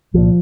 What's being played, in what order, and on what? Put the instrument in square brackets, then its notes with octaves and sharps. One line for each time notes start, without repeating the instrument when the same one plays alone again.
[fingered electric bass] C2 A#2 F3